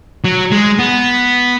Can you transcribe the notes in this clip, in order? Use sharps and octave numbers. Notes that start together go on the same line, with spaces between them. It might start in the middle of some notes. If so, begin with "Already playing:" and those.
F#3
G#3
B3